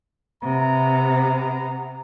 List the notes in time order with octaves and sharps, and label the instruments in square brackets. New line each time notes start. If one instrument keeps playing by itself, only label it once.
[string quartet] C3 [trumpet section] B3 A#5